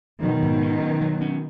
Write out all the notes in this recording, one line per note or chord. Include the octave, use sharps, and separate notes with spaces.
B2 D#3 F#3
G#2
C#4
F#3
F#3
C#4